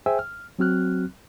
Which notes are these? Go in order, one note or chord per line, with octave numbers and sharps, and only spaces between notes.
G#4 C5 E5 G5 G#5 E6
F6
F#3 C4 F#4 F6 F#6